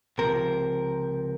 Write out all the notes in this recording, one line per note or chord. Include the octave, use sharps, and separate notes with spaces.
C#2 C3 F3 A#4